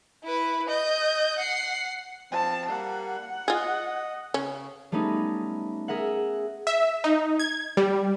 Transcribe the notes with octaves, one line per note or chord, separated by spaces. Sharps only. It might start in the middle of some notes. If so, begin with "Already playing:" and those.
E4 B4
D#5 G6
F#5 C7
F3 C4 A5
G3 A#3 F#5
F4 G#4 D#5
C#3 C#4
G3 A3 B3 C#4 D#4
G#4 A#4 E5 F#5
E5
D#4
G#6
G3